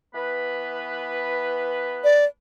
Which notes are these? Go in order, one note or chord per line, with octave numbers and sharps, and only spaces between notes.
E3 B3 B4
D5